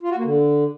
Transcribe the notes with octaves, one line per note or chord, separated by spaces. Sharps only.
F4
F#4
A#3
D3